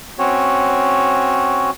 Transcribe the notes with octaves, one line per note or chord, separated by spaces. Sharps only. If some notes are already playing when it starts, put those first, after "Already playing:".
C4 C#4 F#4 C#5